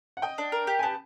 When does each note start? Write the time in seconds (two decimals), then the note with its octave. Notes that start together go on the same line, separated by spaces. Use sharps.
0.17 F#5
0.22 D#5 G5
0.38 D4
0.52 A#4
0.67 G4
0.79 G#5
0.83 B3 A5